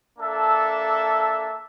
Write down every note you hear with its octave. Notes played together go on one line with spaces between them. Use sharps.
A#3 D4 A4 E5